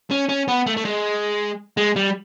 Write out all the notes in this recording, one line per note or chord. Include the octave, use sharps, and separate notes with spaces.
C#4
C#4
B3
A3
A3
G#3
G#3
G3